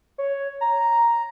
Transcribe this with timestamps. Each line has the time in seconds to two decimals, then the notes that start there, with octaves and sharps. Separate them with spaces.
0.18 C#5
0.61 A#5